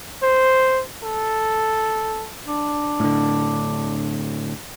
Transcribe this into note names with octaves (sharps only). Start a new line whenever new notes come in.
C5
A4
D4
A2 D3